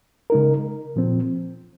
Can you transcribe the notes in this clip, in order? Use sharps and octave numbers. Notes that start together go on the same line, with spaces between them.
C#3 G#3 D#4 A#4
A#2 F3 C4